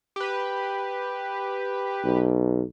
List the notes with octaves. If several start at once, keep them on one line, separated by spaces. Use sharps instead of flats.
G4 B4
B1